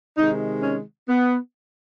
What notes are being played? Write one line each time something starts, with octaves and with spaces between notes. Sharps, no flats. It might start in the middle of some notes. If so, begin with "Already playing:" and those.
C3 D#3 G#3 D#4
C#4
B3